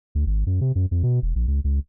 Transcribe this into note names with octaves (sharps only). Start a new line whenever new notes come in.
D2
G#1
F#2
C3
F#2
F2
B2
E1
A#1
C#2
C#2